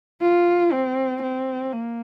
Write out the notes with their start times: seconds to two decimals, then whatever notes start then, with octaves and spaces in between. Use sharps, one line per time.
0.22 F4
0.72 C4
1.22 C4
1.73 A#3